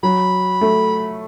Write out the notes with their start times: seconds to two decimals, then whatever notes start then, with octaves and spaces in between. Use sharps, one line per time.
0.03 F#3 B5
0.61 A3